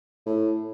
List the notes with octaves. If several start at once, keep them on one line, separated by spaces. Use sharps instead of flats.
A2